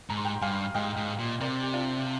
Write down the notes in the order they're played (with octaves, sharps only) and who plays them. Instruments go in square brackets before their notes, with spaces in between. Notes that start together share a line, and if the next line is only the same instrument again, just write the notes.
[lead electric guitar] G#2 [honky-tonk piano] A#5
[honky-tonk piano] C6
G5 A#5
[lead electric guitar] G2 [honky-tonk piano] F5 G#5
[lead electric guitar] G#2 [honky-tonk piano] D#5 G5
[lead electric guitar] G#2
A#2
[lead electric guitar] C3 [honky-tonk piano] A#4 D5
[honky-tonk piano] G4
D4 F4